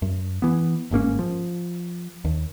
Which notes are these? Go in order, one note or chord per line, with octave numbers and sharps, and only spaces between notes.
F#2
E3 B3
G1 G#2 A#3 C#4
F3
D#2